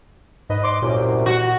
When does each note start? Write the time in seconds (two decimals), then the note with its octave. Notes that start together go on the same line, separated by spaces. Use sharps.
0.50 G#2 B4 D#5
0.64 C6 D6
0.82 C2 F#2 A#2
1.26 F#4